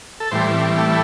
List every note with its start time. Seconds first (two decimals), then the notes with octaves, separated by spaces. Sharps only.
0.20 A4
0.31 A2 E3 G3 C5
0.54 C4
0.77 A3